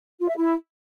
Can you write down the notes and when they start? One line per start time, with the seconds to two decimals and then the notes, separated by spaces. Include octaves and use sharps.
0.20 F4
0.29 E5
0.37 E4